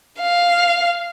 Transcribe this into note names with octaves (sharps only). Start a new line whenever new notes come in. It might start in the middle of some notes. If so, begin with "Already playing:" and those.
F5